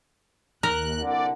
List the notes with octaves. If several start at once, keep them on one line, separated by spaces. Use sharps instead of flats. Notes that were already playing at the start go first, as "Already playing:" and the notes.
D#2 A#4 F#6
C2 D3 D5 F#5